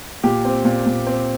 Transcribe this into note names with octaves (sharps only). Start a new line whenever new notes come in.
A#2 G4
C4
A#2
A#2
C4